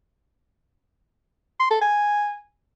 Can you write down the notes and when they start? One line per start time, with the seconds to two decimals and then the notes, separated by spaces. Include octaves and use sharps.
1.60 C6
1.70 A4
1.81 G#5